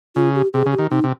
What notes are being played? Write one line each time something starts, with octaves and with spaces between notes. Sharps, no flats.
C#3 F4
G4
C3 G#4
C#3
G4
D#3
C3 D#4
C3